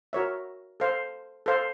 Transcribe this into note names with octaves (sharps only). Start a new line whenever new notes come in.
F#4 A#4 C#5 E5
A4 C5 F5
A4 C5 F5